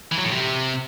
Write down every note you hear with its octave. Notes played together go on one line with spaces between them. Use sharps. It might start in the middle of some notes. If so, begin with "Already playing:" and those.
E3
F#3
A2
C3